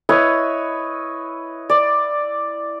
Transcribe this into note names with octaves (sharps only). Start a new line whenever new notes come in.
E4 B4 C#5 D#5
D5